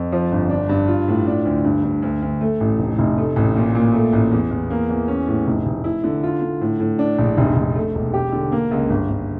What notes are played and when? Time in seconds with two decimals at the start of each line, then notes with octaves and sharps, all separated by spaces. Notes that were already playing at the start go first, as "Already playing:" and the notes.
Already playing: F2
0.12 F3
0.32 G1
0.50 D4
0.69 G2
0.88 F4
1.08 A2
1.27 D4
1.45 D2
1.64 G2
1.83 G2
2.02 D2
2.22 D2
2.41 A3
2.60 A1
2.79 F1
2.98 F1
3.18 A3
3.36 A1
3.56 A#2
3.75 A#2
3.94 A3
4.13 A1
4.31 E2
4.51 E2
4.70 A#3
4.90 E2
5.08 C#4
5.28 A2
5.47 F1
5.66 F1
5.84 E4
6.04 D3
6.23 F4
6.41 D3
6.61 A2
6.80 A2
6.99 D4
7.19 A#1
7.37 F1
7.56 F1
7.75 A3
7.95 E1
8.14 G4
8.32 D3
8.52 A#3
8.71 C#2
8.90 G1
9.10 G1